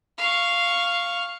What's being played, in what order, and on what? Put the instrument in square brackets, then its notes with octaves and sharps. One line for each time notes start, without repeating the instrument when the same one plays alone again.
[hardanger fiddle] F5 C#6